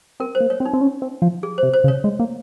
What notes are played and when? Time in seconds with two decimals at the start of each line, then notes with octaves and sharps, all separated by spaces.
0.20 C4 A#4
0.35 C5
0.40 A#3
0.50 C#5
0.60 C4
0.65 D#4
0.73 C4
0.81 C#4
1.02 C4
1.22 F3
1.43 G#4
1.58 C3 C5
1.73 C5
1.84 C#3
1.88 C#5
2.04 G#3
2.19 A#3